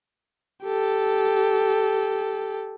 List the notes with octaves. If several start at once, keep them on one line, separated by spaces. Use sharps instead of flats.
G4 A4